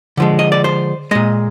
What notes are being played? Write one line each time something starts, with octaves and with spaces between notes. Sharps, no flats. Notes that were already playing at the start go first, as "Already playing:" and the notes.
D3 F3 G#3
D#5
D5
C5
A#2 G#3 D#5